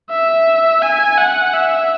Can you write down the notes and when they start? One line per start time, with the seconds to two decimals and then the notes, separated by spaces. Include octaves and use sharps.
0.10 E5
0.82 G#5
1.18 F#5
1.53 E5